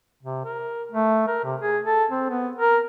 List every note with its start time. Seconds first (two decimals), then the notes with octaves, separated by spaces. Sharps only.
0.23 C3
0.45 A#4
0.92 A3
1.28 A#4
1.44 C3
1.61 G#4
1.85 A4
2.10 C4
2.30 B3
2.55 A#4